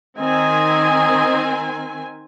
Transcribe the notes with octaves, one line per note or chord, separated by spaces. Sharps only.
D#3 C4 D#5 G#5